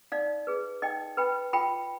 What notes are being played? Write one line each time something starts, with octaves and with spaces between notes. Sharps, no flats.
D#4 D5 F5
G#4 B4
D#4 D#5 G5
B4 G5 B5
F4 G5 B5